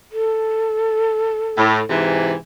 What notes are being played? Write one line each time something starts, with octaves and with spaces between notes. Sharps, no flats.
A4
A2
G#2 C3 E3